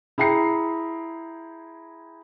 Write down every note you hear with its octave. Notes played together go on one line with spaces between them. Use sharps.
E4 G#4 G5 A#5 C7 C#7